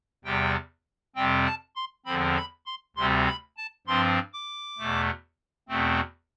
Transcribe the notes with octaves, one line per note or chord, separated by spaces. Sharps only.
E2 C3 G3 G5
F2 C3 G3 C4 G5
A5
C6
E2 D3 F3 C4 B5
B5
C6
D2 C3 G3 C4 C6
B5
A5
G2 F3 C4 C6
D6
E2 B2 A3
E2 B2 A3 C4